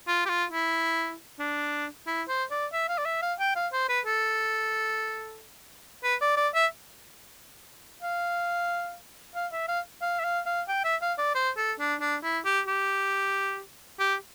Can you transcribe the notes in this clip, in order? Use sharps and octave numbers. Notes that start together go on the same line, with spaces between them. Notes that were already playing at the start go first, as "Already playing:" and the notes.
F4
G4
F4
E4
D4
E4
C5
D5
E5
F5
D5
E5
F5
G5
F5
C5
B4
A4
B4
D5
D5
E5
F5
F5
E5
F5
F5
E5
F5
F5
G5
E5
F5
D5
C5
A4
D4
D4
E4
G4
G4
G4